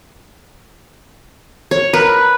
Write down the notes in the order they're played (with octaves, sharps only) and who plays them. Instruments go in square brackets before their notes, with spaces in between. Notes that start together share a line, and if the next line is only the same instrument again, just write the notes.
[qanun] C#5
[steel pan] A#4 [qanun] B4